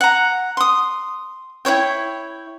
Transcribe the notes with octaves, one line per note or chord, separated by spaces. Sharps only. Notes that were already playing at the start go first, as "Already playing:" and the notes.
F#5 A#5
C6 D#6
E4 F#4 C#5 G5